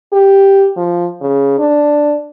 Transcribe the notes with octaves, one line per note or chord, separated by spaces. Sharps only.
G4
F3
C#3
D4